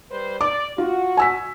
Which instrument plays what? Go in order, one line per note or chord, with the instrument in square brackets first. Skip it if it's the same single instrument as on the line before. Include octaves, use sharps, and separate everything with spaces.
[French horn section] G3 B4 C5
[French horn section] D5 [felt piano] D6
[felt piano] F4 [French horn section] F#4
[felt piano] G#5 E6 B6